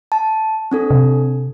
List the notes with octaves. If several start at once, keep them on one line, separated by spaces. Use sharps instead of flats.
A5
C4 D4 A4
C3